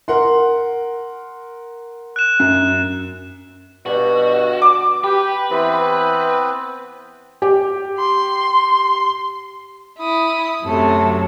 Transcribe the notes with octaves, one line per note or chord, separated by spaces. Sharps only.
A#4 F#5 C6
F#6 E7
F#2
G2 B2 F#4
D6
G4 B4
E3 B3 C4
G4
C6
E4 D#6
F#2 C3 F#3 A3